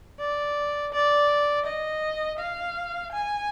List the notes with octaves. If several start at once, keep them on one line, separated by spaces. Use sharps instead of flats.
D5
D5
D#5
F5
G#5